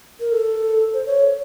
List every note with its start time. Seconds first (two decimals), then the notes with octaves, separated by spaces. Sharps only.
0.20 A#4
0.32 A4
0.94 C5
1.06 C#5